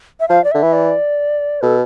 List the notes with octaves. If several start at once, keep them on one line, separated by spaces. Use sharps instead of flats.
E5
F3 F5
D5
D3 E5
E3
D5
B2 A4